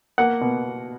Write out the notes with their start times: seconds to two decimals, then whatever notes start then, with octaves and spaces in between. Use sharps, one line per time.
0.18 A#3 F#5
0.41 B2